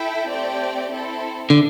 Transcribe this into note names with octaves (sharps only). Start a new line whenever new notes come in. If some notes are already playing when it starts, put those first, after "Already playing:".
Already playing: E4 A4 E5 G5
A3 C4 G4 D5 G5
C4 E4 A4
D3